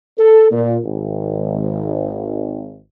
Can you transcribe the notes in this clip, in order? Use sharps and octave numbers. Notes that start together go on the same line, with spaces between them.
A4
A#2
G#1